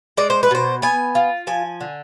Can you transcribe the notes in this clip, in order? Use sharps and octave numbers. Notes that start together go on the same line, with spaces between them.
G#3 D5
C5
B4
B2 C5
B3 G#5
F4
F3 G#5
D3